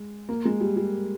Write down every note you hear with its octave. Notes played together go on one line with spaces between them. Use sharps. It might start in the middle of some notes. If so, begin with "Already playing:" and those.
Already playing: G#3
A#3
G#3
G3
G3